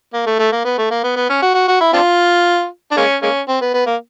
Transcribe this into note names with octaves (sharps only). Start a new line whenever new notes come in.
A#3
A3
A3
A#3
B3
A3
A#3
B3
B3
C#4
F#4
F#4
F#4
E4
C4 D4 F4
D4
G#3 A#3 C#4
G#3 A#3 C#4
C4
B3
B3
A#3